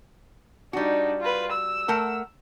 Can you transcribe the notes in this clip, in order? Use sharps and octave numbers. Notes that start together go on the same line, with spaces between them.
G3 D4 D#4 F#4
F4 B4
E6
A3 A#4 F#5